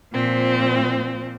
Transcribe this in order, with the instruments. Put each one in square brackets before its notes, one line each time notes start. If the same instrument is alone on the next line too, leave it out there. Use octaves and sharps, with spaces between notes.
[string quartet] A#2 F3 C4